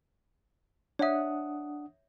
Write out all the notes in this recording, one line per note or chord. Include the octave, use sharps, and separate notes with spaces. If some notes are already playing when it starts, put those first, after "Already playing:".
D4 C#5 E5 F#5 D#6